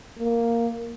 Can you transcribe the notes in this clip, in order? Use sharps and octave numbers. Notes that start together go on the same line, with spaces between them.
A#3